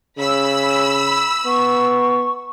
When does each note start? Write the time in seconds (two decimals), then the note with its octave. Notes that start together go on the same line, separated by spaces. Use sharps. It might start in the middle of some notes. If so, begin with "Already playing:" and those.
0.18 C#3 B5 E6
1.46 B3 C#6